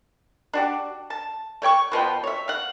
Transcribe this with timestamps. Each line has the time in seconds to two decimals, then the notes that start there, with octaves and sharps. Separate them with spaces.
0.53 D4 F#4 G4
1.10 A5
1.62 A3 C#5 G5 C#6
1.92 B2 F3 B3 G5
2.23 C#5 E5
2.48 F5 F#5